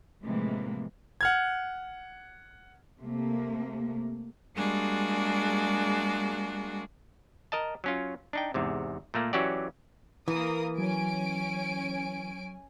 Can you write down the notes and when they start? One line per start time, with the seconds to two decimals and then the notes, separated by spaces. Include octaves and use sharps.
0.23 A2 C3 E3 F3 G#3 A#3
1.21 F#5 F6 G#6
3.00 C3 A3 A#3
4.55 G3 G#3 A#3 D4 F#4 G#4
7.52 A#4 D#5 A5
7.84 F#3 C#4 F4
8.33 D4 D#4 G5
8.54 E2 G#2 C3
9.14 A#2 A3 A#3
9.33 E3 F#3 C#4 F#4 G4 D5
10.28 E3 A#3 A#4 D#6
10.78 F#3 C#4 G#5 D7